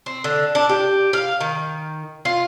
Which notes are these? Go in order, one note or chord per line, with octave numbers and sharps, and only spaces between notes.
C4
D3
D4
G4
F5
D#3
F4